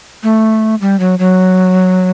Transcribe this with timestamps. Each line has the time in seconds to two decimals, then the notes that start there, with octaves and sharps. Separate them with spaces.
0.23 A3
0.81 G3
1.00 F#3
1.19 F#3